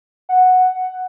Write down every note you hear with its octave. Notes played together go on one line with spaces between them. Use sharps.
F#5